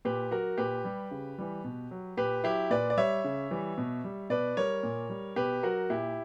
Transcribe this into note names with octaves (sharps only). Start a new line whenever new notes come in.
A#2 G4 B4
F#3 F#4 A#4
A#2 G4 B4
G3
C#3
E3 G3
B2
F#3
A#2 G4 B4
F#3 E4 G4
A#2 B4 D5
D5
G3 C#5 E5
C#3
E3 G3
B2
G3
B2 B4 D5
G3 A#4 C#5
A#2
G3
B2 G4 B4
F#3 F#4 A#4
A#2 E4 G4